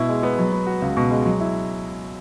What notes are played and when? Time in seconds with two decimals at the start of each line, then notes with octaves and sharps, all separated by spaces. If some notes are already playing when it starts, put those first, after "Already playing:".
Already playing: B2 E4
0.09 G#3
0.23 B3
0.38 F#3
0.52 B3
0.67 F#4
0.82 C#2
0.97 B2
1.11 G#3
1.26 F#3
1.40 E4